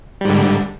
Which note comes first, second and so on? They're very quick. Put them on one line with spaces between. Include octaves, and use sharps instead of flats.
G3 G#2 D3